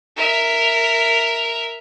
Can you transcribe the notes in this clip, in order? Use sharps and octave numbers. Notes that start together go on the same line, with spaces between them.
A#4 E5